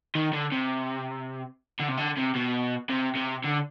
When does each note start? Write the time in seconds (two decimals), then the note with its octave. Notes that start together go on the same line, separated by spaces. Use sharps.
0.15 D#3
0.33 D3
0.52 C3
1.80 D3
1.88 C3
1.97 D3
2.17 C3
2.35 B2
2.90 C3
3.16 C3
3.45 D3